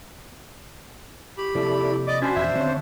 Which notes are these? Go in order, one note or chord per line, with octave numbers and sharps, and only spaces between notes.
G4 B5
C3 F3 A#3 E4 A4 D5
D5 D#5 D6
C#4 D4 F#4 C5 G#5 B5
D#1 E2 G2 E5
D3 D#3 C4 C#4 C#5